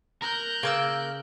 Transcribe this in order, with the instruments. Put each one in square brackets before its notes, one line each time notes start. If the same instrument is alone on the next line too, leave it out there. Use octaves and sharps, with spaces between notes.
[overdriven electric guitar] A#4 [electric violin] F#6 G6
[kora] C#3 [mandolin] A#3 D6 E6